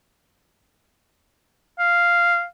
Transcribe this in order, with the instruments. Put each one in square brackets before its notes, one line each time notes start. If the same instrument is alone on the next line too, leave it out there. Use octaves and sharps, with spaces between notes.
[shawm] F5